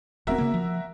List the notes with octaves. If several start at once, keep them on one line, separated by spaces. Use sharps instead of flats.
E1 B3 C4 F#4 A#4 E5
C#3 A#3
F3